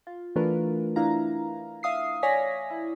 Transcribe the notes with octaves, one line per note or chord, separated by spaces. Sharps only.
F4
E3 A3 D4 F4 A#4 B4
D4 E4 F5 A#5
E5 F5 D#6 C7
C#5 D5 G#5 A#6 B6
E4